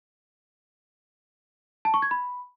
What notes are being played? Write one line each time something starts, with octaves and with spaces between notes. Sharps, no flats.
A5
C#6
G#6
B5